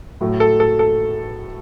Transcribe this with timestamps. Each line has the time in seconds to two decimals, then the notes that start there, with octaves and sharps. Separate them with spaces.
0.21 A2 F#3 A3
0.40 A4
0.60 A4
0.79 A4